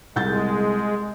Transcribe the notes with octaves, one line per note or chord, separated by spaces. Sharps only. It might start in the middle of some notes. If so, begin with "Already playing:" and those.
C2 G#3 G6 A6